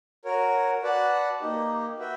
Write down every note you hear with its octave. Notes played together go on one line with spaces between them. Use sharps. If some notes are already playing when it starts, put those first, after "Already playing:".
F#4 A#4 C#5
F#4 B4 D5 F#5 A5
A#3 D#4 G4
F#4 B4 E5 G5